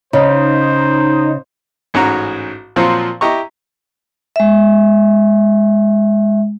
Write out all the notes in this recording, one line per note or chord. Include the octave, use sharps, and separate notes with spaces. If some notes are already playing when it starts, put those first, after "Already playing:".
C#3 D#4 C5
A1 G#2 C#4 F#4 A#5
A#2 F3 F#3 C4 F4
E4 G4 D#5 A#5 C#6
G#3 E5